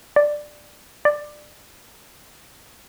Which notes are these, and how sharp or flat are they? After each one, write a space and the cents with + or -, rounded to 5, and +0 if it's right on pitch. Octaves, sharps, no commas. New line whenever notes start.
D5 +10
D5 +20